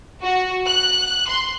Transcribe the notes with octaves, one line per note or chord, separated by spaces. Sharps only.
F#4
F#6
C6